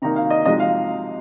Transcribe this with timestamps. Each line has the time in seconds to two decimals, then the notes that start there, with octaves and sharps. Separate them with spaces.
0.02 C3 D#3 A#3 D#4 A#5
0.16 F5
0.30 D#5
0.46 C3 F3 G#3 D#4 D#5
0.60 F5